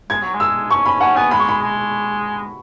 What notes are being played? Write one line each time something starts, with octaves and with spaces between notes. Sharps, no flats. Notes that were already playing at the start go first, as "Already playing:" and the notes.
G#3 G#6
F#3
G#3
E6
C#4 C#6
C#4 B5
C#4 F#5
B3 G#5
G#3 B5
C#6
B5
G#3